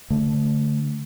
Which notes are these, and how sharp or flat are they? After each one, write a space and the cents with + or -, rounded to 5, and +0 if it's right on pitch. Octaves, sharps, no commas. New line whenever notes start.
D3 -25 A3 +0